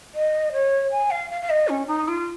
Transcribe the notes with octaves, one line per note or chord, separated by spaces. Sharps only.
D#5
C#5
G#5
F5
F5
F5
D#5
C#4
D#4
F4